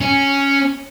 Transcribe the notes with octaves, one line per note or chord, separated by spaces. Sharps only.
C#4